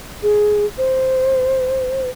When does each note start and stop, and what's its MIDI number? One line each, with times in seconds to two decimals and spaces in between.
0.23 0.66 68
0.78 2.10 72